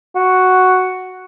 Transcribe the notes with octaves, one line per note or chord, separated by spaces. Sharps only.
F#4